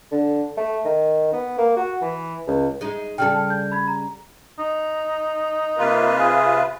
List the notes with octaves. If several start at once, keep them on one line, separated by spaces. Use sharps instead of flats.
D3
A3
D#3
B3
A#3
F#4
E3
C#2
G#3 D#4
C#3 G3 A4 G5 F6
G6
B5 G#6
A#5
D#4
C3 A#3 F4 B4
G#4